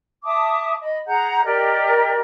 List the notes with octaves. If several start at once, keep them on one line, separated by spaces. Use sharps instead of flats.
E5 A5 D6 D#6
D#5 B5
G#4 F#5 A#5 G6
G4 A#4 D5 D#5